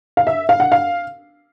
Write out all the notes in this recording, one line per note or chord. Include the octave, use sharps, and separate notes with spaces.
F5
E5
F5
F#5
F5